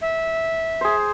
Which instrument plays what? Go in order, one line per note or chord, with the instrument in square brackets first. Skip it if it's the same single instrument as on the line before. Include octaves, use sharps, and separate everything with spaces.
[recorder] E5
[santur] G#4 C5